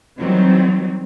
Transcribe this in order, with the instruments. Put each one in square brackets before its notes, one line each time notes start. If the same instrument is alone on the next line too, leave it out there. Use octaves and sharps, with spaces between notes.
[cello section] D#3 E3 F#3 G3 C4